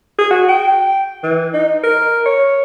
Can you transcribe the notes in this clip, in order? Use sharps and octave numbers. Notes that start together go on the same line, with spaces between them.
G#4
F#4
G5
E3
D#4
A#4
C#5